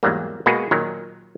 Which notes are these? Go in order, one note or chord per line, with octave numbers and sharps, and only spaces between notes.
E2 G#2 F#3 G3 A#3
B2 G#3 A#3 F#4 G#4 B4
A#2 D#3 F#3 A#4